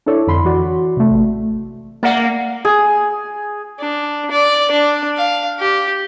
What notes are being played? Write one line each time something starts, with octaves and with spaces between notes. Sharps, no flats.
D4 E4 A4 C#5 D5
F2 D3 B5 C6
E3 F#4 D5
C3 A3
A1
A#3 D5 E5 F#5
G#4
D4
D5
D4
F5
G4